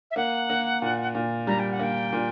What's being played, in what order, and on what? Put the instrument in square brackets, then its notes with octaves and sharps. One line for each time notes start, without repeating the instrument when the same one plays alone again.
[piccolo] E5
[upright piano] A#3 [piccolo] F#5
[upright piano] A#3
A#2
A#2
[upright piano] G3 [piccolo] A#5
[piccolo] G5
F#5
[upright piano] A#3 [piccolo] G5
[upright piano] A#2